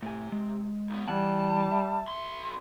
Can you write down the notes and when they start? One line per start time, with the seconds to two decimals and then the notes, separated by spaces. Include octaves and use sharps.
0.03 A2 C3 G#5
0.32 G#3
0.90 B1 B3
1.08 E3 G3 F#5 G#5 A5
1.71 E5
2.08 B1 C6